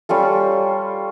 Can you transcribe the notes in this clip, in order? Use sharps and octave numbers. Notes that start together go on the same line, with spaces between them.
G3 C#4 F4 A4